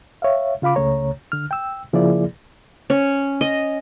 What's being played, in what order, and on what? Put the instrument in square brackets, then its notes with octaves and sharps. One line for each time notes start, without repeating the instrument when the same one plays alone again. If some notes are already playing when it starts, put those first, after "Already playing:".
[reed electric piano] C#5 E5 F5
C#3 F4 F5 B5 D6
C#2 C#3 A3 C#5 A#5
D3 F6
G5 E6
C#3 F3 A#3 E4 G#4 D5
[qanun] C#4
D#5